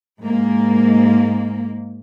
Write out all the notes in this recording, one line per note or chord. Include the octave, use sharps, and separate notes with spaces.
G#2 A#3